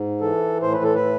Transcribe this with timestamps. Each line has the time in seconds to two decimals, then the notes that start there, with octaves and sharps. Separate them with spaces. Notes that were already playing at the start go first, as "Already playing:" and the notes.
Already playing: G#2
0.21 E3 A4
0.62 A2 C5
0.73 B4
0.83 A4
0.94 B4